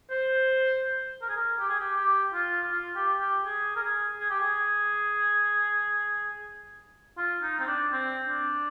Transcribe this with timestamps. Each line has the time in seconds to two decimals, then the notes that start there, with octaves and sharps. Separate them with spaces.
0.10 C5
1.22 A#4
1.29 G#4
1.36 A#4
1.59 G4
1.69 G#4
1.80 G4
1.96 G4
2.34 F4
2.71 F4
2.96 G4
3.21 G4
3.46 G#4
3.76 A#4
3.82 G#4
4.20 G#4
4.30 G4
4.41 G#4
7.18 F4
7.43 D#4
7.59 C4
7.67 D4
7.92 C4
8.29 D4